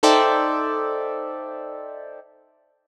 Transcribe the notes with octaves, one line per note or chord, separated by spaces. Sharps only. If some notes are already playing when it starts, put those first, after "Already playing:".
D#4 A4 C5 D5 E5 G5